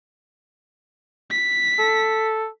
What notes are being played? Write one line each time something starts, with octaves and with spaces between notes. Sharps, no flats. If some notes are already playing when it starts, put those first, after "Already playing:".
B6
A4